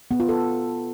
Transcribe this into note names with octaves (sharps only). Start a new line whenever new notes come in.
B3
F4
A4